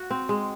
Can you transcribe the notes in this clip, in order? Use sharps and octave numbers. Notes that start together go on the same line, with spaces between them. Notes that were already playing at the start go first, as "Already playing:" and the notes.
Already playing: F#4
C4
G#3